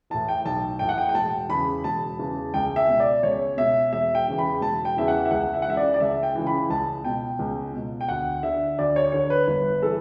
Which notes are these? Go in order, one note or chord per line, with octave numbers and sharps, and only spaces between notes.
A2 E3 A5
G5
B1 A5
A2 E3 G5
F#5
G5
G5
E1 A5
E2 C#3 B5
E1 A5
E2 C#3
C#2 G5
E5
B2
D5
C#2 C#5
B2 E5
E1 E5
G5
E2 C#3 E3
B5
E1 A5
G5
E2 C#3 E3 E5
F#5
E5
C#2 F#5
E5
F#5
C#3 E3 E5
D5
D5
C#2 E5
G5
C#3 E3
B5
C#2 A5
B2 G5
C#2
B2
G5
D2 F#5
D3 E5
D2 D5
C#5
D3 C#5
B4
G1 B4
E3 A4